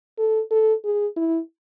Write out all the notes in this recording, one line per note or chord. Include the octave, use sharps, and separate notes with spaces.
A4
A4
G#4
E4